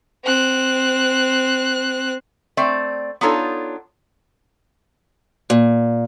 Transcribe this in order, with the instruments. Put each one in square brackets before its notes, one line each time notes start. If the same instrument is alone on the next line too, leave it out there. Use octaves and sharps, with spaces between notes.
[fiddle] C4 F#6
[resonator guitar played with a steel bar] A3 C4 D5
B3 D4 D#4 F4 A4 C#5
[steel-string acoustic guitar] A#2